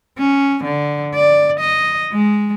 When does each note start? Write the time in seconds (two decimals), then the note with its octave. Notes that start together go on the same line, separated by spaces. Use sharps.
0.19 C#4
0.64 D3
1.15 D5
1.60 D#5
2.12 G#3